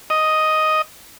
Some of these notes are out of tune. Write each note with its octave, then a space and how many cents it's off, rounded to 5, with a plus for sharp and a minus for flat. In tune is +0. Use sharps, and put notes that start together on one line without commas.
D#5 +5